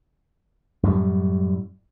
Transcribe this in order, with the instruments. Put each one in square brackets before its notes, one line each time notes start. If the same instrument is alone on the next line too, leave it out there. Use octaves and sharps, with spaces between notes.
[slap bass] F#2 A2 G3